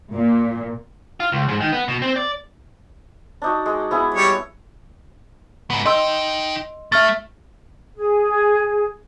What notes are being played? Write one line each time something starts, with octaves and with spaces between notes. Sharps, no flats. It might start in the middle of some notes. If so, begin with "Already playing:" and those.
A#2
F4
C#2
G#2
D#3
B3
B2
C4
D5
D4 D#4 F#4
G#3
B3 E4 G#4
G3 C#5
G#2 B3
D#4 D#5 G5 C6 E6
A3 E5 F6 A6
G#4